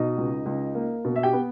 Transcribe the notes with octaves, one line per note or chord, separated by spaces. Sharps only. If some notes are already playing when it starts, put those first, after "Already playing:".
Already playing: B2 D#4 D#5
C#2
C#2
A#3
B2
E5
G4 G5
B3